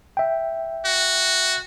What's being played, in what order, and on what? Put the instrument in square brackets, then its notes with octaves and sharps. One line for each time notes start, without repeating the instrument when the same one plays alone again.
[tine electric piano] E5 G5
[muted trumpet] F#4